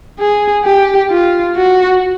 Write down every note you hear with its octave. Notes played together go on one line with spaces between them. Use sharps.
G#4
G4
F4
F#4